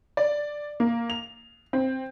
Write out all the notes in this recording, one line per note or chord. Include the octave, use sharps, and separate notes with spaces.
D5
A#3
F7
C4